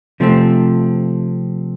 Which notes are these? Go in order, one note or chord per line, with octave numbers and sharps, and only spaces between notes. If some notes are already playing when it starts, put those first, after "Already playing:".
C3 F3 A3 C4